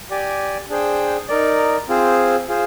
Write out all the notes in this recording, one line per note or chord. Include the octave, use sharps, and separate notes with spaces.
G4 D5 G#5
D4 G#4 C5 G5
D#4 A#4 D5
C4 F4 G#4 C5
F4 G#4 C5